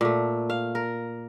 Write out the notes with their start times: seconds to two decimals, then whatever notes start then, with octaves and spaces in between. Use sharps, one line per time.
0.01 A#2 A3
0.50 F5
0.75 A#4